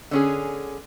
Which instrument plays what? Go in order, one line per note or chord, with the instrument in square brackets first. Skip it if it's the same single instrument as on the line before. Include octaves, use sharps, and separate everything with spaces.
[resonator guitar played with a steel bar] D3 C#4 G#4